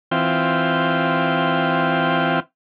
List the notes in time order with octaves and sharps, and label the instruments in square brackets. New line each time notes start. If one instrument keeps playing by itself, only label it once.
[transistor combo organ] E3 C4 F4 G5